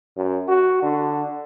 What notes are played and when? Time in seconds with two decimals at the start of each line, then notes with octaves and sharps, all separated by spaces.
0.17 F#2
0.48 F#4
0.82 D3